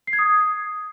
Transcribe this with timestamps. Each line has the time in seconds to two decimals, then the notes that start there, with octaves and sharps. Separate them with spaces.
0.07 C7
0.13 G#6
0.19 D#6